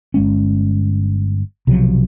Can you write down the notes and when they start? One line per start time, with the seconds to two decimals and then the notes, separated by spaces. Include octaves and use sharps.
0.14 G1 G#3 C#4
1.67 B1 C3 F3 F#3